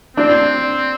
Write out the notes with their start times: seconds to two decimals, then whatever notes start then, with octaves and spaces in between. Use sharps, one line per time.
0.17 C4 D4